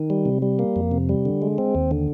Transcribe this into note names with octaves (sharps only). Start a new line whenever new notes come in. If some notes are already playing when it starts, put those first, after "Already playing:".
Already playing: D#3
G3
C3
G3
A#3
F2
C3
G3
D3
G#3
C4
D#2
D3